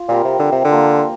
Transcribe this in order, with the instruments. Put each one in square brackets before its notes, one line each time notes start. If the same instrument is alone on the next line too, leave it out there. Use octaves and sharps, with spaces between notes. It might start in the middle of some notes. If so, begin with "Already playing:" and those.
Already playing: [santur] F4
[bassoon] A#2 [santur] G3 C4 G4 A#4
[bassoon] C3
D3
C3
D3
[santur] F3 A#3 F4 A#4